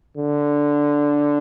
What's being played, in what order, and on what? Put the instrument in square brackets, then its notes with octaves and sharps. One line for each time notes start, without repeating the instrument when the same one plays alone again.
[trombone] D3